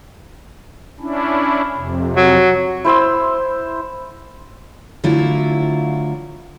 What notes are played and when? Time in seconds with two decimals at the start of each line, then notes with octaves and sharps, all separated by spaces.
1.00 C#4 D4 E4
1.75 F2 C3
2.16 F#3
2.85 E4 C5 C6 E6
5.04 D3 F#3 A3 E4 F4